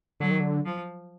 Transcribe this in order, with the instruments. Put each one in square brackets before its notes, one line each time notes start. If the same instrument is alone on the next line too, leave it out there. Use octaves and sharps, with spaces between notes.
[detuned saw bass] D3 [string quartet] F#3
[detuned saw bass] D#3
D3
[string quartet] F3